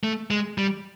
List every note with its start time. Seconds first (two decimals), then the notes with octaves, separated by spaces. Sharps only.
0.03 A3
0.31 G#3
0.58 G3